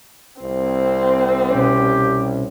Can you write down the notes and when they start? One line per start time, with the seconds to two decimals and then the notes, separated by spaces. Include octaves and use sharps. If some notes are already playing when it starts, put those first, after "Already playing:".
0.42 C2 C4
1.50 B2 C#4 G4 C#5